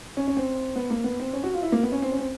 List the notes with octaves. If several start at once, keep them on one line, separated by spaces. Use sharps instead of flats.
C#4
C#4
C4
B3
A#3
B3
C4
C#4
F#4
F4
E4
A#3
B3
C#4
C4
C#4
C4